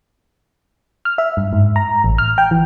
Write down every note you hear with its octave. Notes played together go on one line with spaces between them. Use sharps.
F6
E5
G2
G#2
A#5
A1
F6
G5
E3